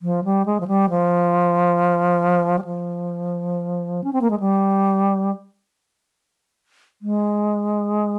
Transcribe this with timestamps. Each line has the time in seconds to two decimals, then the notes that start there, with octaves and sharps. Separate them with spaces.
0.02 F3
0.24 G3
0.46 G#3
0.60 F3
0.68 G3
0.90 F3
2.59 G3
2.64 F3
4.04 C#4
4.13 C4
4.21 A#3
4.30 G#3
4.40 G3
7.02 G#3